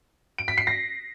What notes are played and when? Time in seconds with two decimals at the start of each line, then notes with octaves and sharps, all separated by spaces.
0.38 D7
0.48 B6
0.58 C7
0.67 A#6